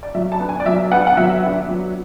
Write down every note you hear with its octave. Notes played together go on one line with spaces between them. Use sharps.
D5
F#3 E5
A5
B3 D4
G#5
D5
F#3 E5
B3 D4 F#5
F#5
F#3 E5
B3 D4
F#3